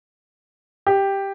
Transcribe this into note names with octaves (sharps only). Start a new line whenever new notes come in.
G4